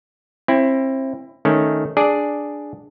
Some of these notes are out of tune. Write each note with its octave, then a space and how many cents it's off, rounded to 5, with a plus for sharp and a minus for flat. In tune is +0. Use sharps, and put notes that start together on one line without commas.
C4 +30 E4 +15
D#3 +0 A3 +0 C#4 +0
D4 +0 G#4 +0 D5 +0